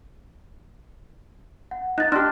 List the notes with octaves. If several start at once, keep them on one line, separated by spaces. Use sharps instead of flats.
F#5
D#4 F#6 A6
D4 G4 C6 F6 F#6